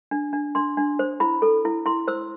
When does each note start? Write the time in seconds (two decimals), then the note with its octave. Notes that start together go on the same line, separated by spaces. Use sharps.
0.11 D4
0.33 D4
0.55 D4 C6
0.77 D4
0.99 C5
1.20 E4 B5
1.42 A4
1.65 E4
1.86 E4 C6
2.08 C5 E6